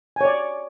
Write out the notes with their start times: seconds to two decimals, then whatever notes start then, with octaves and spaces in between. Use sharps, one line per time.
0.16 G#5
0.21 C#5
0.25 D5